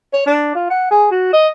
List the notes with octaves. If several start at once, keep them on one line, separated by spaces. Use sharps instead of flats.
C#5
D4
F4
F#5
G#4
F#4
D#5